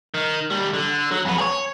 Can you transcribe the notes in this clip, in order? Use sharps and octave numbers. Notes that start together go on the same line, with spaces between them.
D#3
D#2 G3
D3
F#3
F2 B3
G#4 C#5